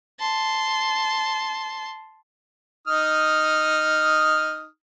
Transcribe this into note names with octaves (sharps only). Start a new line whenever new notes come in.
A5 C6
D#4 D#6 F6